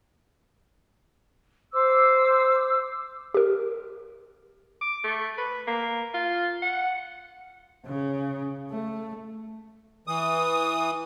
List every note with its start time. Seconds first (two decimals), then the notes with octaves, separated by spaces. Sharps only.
1.72 C5 D6 E6
3.34 G4 A#4
4.81 D6
5.04 A3
5.38 B4
5.67 A#3
6.14 F4
6.62 F#5
7.85 C#3
8.70 A3
10.07 E3 D#6